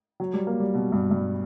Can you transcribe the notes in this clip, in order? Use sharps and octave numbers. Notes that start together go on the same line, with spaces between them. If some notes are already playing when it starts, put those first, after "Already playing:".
F#3
G3
A#3
G3
B2
G2
G2